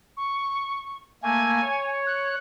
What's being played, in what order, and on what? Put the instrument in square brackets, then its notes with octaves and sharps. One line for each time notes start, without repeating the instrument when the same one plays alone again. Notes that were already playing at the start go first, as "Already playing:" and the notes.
[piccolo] C#6
[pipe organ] A3 A#3 [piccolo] G#5
[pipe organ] C#5
[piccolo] F#6